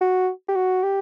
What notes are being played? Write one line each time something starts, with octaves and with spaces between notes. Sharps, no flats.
F#4
G4
F#4
G4